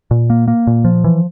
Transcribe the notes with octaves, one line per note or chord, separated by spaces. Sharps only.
A#2
A#3
A#3
A#2
F3
E3